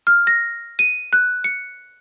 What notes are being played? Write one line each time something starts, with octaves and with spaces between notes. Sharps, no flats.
F6
A#6
D#7
F#6
C#7